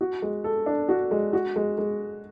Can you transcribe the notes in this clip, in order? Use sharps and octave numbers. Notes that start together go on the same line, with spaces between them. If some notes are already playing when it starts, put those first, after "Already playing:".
F#4
G#3
A4
D4
F#4
G#3
F#4
G#3
G#3